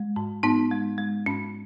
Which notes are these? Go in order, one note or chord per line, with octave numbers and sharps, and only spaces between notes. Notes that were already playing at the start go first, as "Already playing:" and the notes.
Already playing: G#3
G#2
G#2 B3 D#4
G#3
G#3
G#2 C#4